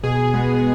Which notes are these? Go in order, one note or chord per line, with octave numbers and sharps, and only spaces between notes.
B2 G#4
G#3 B3